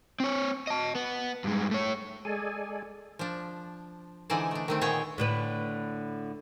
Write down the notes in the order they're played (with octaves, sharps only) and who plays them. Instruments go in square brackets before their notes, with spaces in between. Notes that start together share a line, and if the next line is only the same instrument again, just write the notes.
[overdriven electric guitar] C4 C#5
D#5 A5
B3
G2 G#3
A3 C#5
[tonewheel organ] G#3 G#4 A4 D5 G#5
[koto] F3 D4
D3 E3 G#3 D#4 C5 D5
A3 D4
D#3 A3 C4
A#2 B3 G#4 C#5 G5
[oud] A2 D3 B4